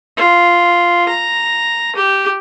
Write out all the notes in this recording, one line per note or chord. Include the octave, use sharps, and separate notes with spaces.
F4
A#5
G4